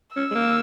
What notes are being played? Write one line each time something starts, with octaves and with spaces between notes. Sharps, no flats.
C#4 E6
G#3
A#3